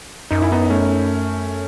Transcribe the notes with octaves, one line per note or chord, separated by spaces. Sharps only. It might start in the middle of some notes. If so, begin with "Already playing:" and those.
F#2 D#4
E4
B3 D#4
A3 C#4